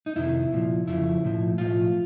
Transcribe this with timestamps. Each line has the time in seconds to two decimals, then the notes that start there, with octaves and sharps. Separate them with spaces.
0.06 D#4
0.15 F2 C3 D#3 E4
0.52 C2 A#2 F3
0.87 F2 C#3 F3 E4
1.23 B1 A2 F3
1.58 B1 A2 F3 F4